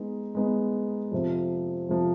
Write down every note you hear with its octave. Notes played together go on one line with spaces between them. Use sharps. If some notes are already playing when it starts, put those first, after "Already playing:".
Already playing: G#3 B3 D#4
G#3 B3 D#4
F2 C3 F3
F2 C3 F3